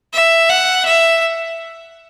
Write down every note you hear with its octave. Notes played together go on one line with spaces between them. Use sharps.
E5
F#5
E5